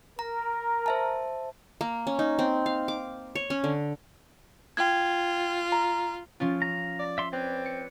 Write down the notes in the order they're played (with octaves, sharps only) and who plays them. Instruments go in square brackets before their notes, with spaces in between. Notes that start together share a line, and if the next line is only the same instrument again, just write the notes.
[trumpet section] A#4 [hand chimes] A#5
[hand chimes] C5 E5 A5
[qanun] A#3
C#4
D#4
C4
F5
D6
C#5
C#4
D3
[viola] F4 [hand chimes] G5 G#6
[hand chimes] A#5
[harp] F3 C#4 F4
[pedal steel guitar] A#5
[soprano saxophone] D5
[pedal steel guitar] E5 C6
[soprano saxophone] C4 [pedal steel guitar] B4 C#5 D5
[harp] C#7